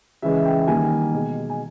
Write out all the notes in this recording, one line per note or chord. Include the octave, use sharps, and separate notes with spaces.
C#3 E3 G#3 E5
G5
D#3 G3 A#3 G#5
B2 G#3
G#5